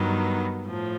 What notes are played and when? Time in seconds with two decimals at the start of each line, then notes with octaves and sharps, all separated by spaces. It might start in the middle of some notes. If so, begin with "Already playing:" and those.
Already playing: G2 D#3 F#3 B3
0.66 A2 F3